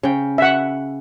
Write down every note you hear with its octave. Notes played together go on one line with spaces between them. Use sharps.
C#3 G5
E5 F#5